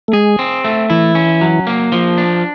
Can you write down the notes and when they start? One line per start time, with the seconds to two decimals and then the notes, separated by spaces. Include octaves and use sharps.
0.08 A3
0.13 G#3 G#4
0.39 C4
0.64 A3
0.90 E3 E4
1.15 C#4
1.41 F#3
1.67 A#3
1.92 F3
2.18 D4